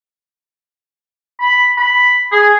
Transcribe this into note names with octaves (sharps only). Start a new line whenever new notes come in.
B5
B5
G#4